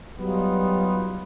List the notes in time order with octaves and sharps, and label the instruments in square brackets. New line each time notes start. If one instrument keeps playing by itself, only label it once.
[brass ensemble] F#3 G3 B3 D#4 F4